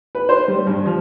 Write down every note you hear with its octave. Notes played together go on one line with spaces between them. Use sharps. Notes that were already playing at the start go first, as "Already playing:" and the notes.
B4
C5
G3
G2
F3